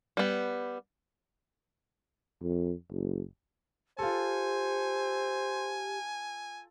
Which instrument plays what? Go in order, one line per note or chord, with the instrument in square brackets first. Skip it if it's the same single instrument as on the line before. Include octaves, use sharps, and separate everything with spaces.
[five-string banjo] G3 B3
[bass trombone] F2
F#1
[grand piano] F4 A4 [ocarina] G4 [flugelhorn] C5 [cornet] G#5